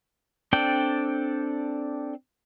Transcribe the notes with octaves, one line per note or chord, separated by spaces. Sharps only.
C4 D4 A4 D5 G5